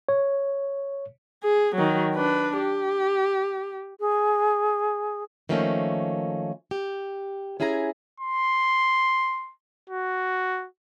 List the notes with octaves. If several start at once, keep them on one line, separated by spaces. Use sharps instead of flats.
C#5
G#4
D#3 F#3
D4 B4
G4
G#4
D#3 F3 A3 A#3 C#4
G4
C#4 E4 G#4 G#5 A#5
C6
F#4